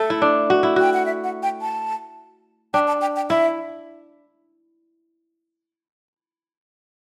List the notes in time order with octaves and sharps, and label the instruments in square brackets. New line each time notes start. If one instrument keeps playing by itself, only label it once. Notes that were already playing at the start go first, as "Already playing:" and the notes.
Already playing: [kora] A3 [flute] A4
[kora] E4
D4
F#4
E4
[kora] F#4 [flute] G5
[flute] F#5
E5
F#5
G5
A5
[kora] D4 [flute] G5
[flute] A5
G5
G5
[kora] E4 [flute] E5